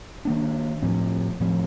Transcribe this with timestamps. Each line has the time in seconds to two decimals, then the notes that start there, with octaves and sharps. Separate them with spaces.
0.25 D#3 A#3 D4
0.82 A2 F3 C4
1.40 A2 F3 C4